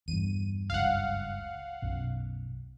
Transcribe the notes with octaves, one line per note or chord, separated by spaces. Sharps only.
E2 G2 D#7
F#1 C#2 G2 F5 F#5
B1 F#2